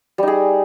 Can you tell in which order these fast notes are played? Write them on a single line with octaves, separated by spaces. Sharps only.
G3 D#4 G#4